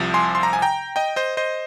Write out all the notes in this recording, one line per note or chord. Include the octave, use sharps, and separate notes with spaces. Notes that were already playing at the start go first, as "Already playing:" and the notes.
Already playing: C2 C3 F3
G#5 C6
C6
A#5
G#5
G5 A#5
D#5 G5
C5 D#5
C5 D#5